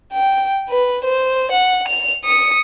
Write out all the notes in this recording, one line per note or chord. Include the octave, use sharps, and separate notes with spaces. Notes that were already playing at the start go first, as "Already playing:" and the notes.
G5
B4
C5
F#5
F7
D#6 C#7